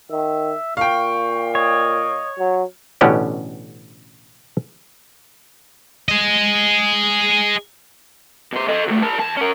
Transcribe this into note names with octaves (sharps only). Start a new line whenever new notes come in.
D#3 E5
A#2 F5 G5 C#6
C#5 D#5
F#3
A1 B2 D3 C#4 G4
G#4 D#5
B2 C5
A4 D#5
C#2 A3
A#4 A5
E2 A5
C#4 A#4